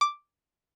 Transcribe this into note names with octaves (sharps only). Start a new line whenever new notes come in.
D6